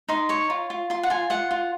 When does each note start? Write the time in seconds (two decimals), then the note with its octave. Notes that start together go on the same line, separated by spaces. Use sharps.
0.09 D#4 C6
0.29 C#5 C#6
0.50 F4
0.70 F4
0.90 F4 C6
1.03 F#5
1.10 F4 G#5
1.30 F4 F#5
1.51 F4